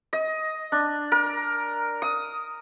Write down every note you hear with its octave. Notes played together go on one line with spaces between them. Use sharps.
D#5
D4
A#4
D#6